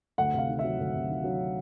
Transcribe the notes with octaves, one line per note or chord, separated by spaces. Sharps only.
D2 F#5
C3 F5
D#3
E5
F#3
D2
C3
D#3
F#3